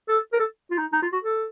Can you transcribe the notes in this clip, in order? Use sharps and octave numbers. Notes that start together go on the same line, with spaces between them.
A4
A#4
A4
F4
D#4
D#4
F4
F#4
A4